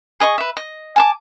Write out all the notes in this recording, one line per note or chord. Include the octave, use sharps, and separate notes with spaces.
G#4 D#5 B5 C#6
B4 E5
D#5
G#5 A5 D6